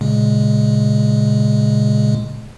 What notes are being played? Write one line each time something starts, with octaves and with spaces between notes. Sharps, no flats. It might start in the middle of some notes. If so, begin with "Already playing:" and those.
A#2 C#3 G#3